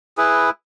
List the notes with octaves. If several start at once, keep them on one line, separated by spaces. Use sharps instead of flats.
E4 G#4 B4